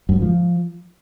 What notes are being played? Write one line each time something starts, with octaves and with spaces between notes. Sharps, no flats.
F#2
G#2
F3